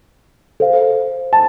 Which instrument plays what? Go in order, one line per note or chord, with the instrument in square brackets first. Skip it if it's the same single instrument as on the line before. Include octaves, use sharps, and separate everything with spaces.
[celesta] A4 C5 F5
[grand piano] A5